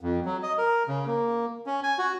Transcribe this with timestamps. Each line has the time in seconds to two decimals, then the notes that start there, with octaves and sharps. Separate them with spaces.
0.01 F2
0.25 F#3
0.43 D#5
0.58 A#4
0.88 C#3
1.07 A#3
1.66 C#4
1.83 G#5
1.98 F#4